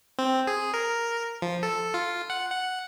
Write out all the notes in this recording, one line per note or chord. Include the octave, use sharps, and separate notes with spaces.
C4
G#4
A#4
F3
A4
F4
F#5
F#5